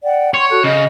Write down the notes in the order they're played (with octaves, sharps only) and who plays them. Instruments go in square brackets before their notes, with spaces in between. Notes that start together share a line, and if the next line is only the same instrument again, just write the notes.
[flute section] D5 F#5 G5
[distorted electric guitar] C#5 [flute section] C6 C#6 G#6
[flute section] F#4 A4 F#6
[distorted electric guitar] C#3 [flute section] D#5